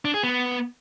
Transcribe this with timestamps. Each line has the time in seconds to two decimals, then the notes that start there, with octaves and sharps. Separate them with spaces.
0.05 D4
0.14 G#4
0.23 B3